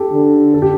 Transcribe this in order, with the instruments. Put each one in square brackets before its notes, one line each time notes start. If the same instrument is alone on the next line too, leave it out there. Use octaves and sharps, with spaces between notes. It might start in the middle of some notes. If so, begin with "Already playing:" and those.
Already playing: [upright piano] G4 A4
[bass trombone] D3
[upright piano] A4
G4